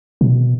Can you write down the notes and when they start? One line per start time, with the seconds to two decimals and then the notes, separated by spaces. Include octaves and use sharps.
0.21 B2